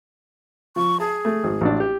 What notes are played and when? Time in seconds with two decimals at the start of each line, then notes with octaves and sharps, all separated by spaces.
0.76 F3 C#6
1.00 G#4 A5
1.25 A3
1.44 G#1
1.61 A1 D4
1.80 G4